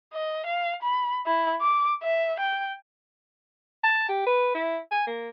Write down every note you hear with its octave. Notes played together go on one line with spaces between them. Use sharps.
D#5
F5
B5
E4
D6
E5
G5
A5
G4
B4
E4
G#5
A#3